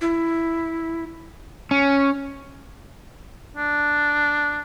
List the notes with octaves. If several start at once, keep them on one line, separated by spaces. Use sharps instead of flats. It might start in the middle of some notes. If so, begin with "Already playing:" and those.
E4
C#4
D4